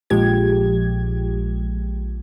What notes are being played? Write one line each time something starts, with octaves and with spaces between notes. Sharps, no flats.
A#1 A#2 F3 G#3 G4 G#6